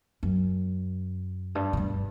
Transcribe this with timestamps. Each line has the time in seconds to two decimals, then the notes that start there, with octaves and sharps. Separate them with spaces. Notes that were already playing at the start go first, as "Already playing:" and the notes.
0.23 F#2
1.55 G2
1.73 A#2
1.77 G2